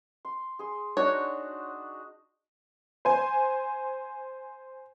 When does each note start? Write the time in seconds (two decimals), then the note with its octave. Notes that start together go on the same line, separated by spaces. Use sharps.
0.25 C6
0.59 G#4 C6
0.97 D4 D#4 F#4 C#5
3.05 C5 G#5